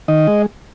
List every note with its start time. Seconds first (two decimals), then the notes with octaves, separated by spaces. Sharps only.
0.08 D#3 D#5
0.27 G#3